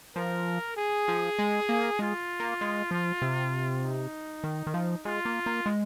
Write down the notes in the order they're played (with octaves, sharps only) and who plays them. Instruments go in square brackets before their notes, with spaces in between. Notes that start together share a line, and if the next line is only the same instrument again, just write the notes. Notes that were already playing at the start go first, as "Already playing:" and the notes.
[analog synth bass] F3 [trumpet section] A#4
[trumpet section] G#4
[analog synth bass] F3
G#3
A#3
[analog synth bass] G#3 [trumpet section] F4
[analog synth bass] A#3
G#3
F3
C3
[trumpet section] D#4
[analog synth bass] D#3
D#3
F3
[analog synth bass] G#3 [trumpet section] F4
[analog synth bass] A#3
A#3
G#3